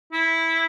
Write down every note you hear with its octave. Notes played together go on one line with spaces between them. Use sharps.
E4